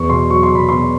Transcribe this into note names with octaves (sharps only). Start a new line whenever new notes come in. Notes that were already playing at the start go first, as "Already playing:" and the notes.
Already playing: E2 C#6
B2 C6
F#3 C#6
C6
B2 B5
B2 C6